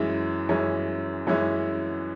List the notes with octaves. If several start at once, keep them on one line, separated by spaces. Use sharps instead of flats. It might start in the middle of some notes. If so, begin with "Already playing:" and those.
Already playing: F#2 E3 G#3 C#4 E4
F#2 E3 G#3 C#4 E4
F#2 E3 G#3 C#4 E4